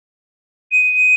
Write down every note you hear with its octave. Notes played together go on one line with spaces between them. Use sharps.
D#7